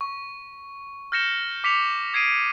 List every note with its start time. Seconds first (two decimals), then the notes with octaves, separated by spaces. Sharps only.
0.01 C#6
1.12 F6 G6 A#6 C#7 E7 G7
1.64 D6 B6 C#7 F7
2.13 D#6 G#6 C7 D7 D#7